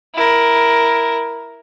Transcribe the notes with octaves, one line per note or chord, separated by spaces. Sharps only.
E4 A#4